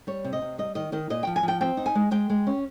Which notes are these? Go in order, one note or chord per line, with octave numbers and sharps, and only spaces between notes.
G3 C#5
C3
D#5
C3
G3 D#5
D#3 D#5
D#3 D#5
A#2 D#5
F3 G5
G#5
F3 G5
C4 G5
D#4
G#5
G#3
G#3 G5
G#3
C#4